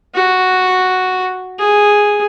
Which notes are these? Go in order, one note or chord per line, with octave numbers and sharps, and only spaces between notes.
F#4
G#4